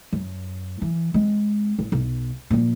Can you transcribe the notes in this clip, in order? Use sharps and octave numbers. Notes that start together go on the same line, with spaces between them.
F#2
E3
G#3 C4
A1
B1
A#2 F3